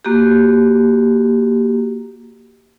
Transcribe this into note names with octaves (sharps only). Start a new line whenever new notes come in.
A#3 F#4 G4